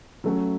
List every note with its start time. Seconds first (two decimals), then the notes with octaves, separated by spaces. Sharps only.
0.24 F#3 A3 C#4 F#4